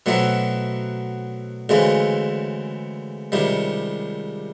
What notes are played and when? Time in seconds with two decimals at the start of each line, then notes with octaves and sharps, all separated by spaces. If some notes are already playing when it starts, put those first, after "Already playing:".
0.06 B2 F#3 A3 C4 E4
1.69 D2 C#3 E3 G#3 C4
3.32 C#2 C3 D#3 G3